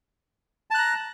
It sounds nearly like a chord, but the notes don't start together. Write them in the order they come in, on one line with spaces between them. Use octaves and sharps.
A5 F#6 A#5